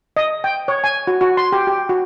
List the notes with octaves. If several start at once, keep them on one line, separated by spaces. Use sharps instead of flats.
D#5
G5
C#5
G#5
F#4
F#4
C6
G4
G4
F#4